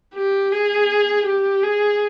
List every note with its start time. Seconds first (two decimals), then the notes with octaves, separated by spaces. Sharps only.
0.15 G4
0.52 G#4
1.25 G4
1.63 G#4